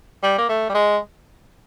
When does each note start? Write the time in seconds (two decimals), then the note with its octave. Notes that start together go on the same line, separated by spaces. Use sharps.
0.23 G3
0.38 A#3
0.49 A3
0.69 G3
0.74 G#3